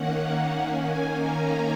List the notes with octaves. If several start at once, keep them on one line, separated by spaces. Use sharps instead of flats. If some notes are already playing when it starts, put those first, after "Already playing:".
Already playing: D#3 A#3 C#4 F#5
D#3 A#3 C#4 G#5
A#5